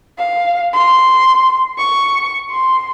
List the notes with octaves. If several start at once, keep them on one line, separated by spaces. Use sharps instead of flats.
F5
C6
C#6
C6